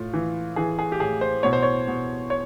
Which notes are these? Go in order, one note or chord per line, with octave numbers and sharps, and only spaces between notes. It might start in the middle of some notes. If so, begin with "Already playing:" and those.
Already playing: A2 F4
E3
E3 G#4
G#4
G4
A2 G#4
C5
B2 C#5
C5
C#5
B2
C#5